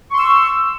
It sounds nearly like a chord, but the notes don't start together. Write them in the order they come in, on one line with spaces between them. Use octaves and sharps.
C#6 C6 E6